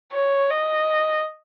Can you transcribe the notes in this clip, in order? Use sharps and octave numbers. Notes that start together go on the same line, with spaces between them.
C#5
D#5